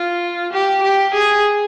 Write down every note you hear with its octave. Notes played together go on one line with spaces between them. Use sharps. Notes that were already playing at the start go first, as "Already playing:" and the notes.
Already playing: F4
G4
G4
G#4